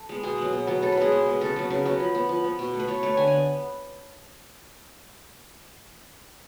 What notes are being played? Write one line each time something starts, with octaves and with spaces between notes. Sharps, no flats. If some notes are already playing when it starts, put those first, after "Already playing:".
Already playing: A4
G#3 B3
B2 G#4
F#3 B3
B2
F#3 B3
B2 A4
B4
G#3 B3 G#4
B2
G#3 B3
C#3 A4
F#3 B3
C#3 B4
F#3 B3
F3
B3
F3
B3
B2
A3
B4
B2 C#5
A3 C#5
D3 G#5
B3 G#5